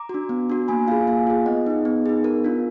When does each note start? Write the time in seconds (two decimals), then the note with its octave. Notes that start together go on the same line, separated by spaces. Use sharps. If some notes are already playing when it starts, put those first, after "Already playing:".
Already playing: A#5 D6
0.09 D4 F#4
0.29 B3
0.50 D4 F#4
0.68 A#3 G#5 B5
0.87 F4 G#4 F5 G#5
1.07 A#3 F5 G#5
1.27 F4 G#4
1.46 B3 D#5 F#5
1.67 D#4 G#4
1.85 B3
2.06 D#4 G#4
2.24 B3 A#4
2.44 D4 F4